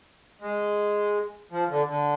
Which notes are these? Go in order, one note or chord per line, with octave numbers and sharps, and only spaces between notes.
G#3
F3
D3
D3